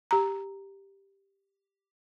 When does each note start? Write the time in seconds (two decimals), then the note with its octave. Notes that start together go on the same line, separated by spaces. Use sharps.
0.11 G4 A#5